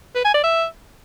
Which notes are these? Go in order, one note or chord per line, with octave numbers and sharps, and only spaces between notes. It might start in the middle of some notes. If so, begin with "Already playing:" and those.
B4
G#5
D5
E5